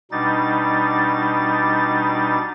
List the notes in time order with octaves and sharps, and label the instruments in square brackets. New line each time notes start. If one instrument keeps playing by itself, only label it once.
[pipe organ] B2 G3 D4 D#4 A6